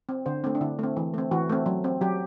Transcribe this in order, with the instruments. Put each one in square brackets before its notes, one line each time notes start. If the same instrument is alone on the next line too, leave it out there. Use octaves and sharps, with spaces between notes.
[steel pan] C4
D3 C5
A3 C4 D4
D4
D3 E4
A3 C4
E3
A3 C4
E3 F#4
A3 C4
F#3
C4
F#3 G4